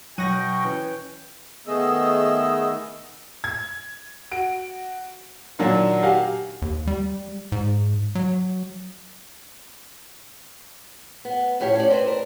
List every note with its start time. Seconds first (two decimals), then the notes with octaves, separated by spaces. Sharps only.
0.18 B2 F#3 G5 C#6 F#6 A#6 D#7
0.64 E3 C#4
1.67 D#3 A3 B3 G#4 D#5 E6
3.44 G#6
4.31 F#4 D7
5.59 A#2 D#3 F#3 A#3 D4
6.03 F#4 G4 F5 G#5
6.62 D#2
6.87 G3
7.52 G#2
8.15 F#3
11.25 B3
11.60 F2 A2 G4 C#5 F5
11.76 C#4 D5
11.90 C4 D4 B4 C5
12.08 A#4